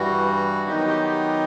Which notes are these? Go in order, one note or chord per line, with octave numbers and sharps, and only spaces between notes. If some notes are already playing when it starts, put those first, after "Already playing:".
Already playing: G2 E3 G3 F#4
D#3 F#3 B3 D#4 G4
G4
G4